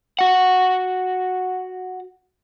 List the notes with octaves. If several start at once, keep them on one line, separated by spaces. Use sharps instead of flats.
F#4 F#5